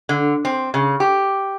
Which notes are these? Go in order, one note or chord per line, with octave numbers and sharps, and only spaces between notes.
D3
C4
C#3
G4